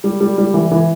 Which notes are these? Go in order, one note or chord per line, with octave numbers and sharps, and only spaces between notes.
G3
G3
G3
E3
E3